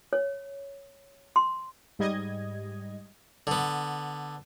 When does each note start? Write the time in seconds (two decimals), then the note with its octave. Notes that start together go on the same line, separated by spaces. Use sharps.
0.13 C#5
1.36 C6
1.99 G#2 G3 D#5 G#6
3.47 D3 B3